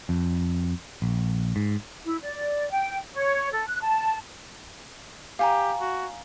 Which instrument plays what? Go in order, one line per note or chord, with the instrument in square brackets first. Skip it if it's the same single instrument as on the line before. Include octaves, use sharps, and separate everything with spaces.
[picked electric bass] F2
A#1
G#2
[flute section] E4
D5
G5
C#5
A4
F#6
A5
[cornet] G4 [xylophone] F5 G#5 A#5
[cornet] F#4